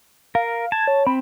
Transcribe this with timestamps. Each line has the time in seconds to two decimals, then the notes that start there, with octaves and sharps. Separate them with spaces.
0.35 A#4 F5
0.72 A5 G#6
0.87 C#5
1.07 C4 B5